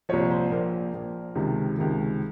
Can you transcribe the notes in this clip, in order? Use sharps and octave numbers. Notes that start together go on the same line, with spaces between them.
C2 A#2 F3 C#5
C5
A#1 A#2 F3 A#4
A#1 A#2 F3
C#2 C3 D#3
C#2 C3 D#3